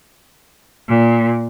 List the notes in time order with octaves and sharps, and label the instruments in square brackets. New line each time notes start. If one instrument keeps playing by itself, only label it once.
[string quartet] A#2